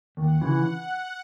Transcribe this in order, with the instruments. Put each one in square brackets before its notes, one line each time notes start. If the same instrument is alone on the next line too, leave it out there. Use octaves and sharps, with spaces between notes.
[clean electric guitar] D#2 [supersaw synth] F#5
[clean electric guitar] C#3 E3